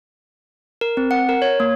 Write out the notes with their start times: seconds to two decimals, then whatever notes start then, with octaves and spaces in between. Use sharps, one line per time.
0.81 A#4
0.97 C4
1.11 F#5
1.29 A#4
1.42 C#5
1.60 A#3